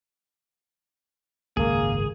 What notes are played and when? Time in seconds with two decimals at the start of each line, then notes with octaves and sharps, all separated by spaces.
1.57 G#1 C#2 F#2 A#3 G#4